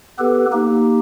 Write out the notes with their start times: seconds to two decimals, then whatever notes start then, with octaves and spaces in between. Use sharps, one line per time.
0.19 B3 G4 A4 B4
0.52 A#3 D#4 G4